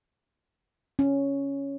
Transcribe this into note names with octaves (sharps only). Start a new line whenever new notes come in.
C#4